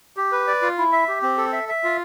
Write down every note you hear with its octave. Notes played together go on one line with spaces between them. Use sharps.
G4
B4
D5
F4
E4
E5
G4
C4
A4
E5
E5
F4